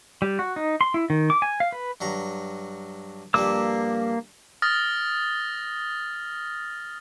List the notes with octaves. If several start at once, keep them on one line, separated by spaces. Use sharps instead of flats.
G3
F#4
D#4
C6
E4
D#3
D6
G#5
F5
B4
G2 F#3 A#5
G2 F3 G3 A#3 D6 E6
D#6 F6 A6 A#6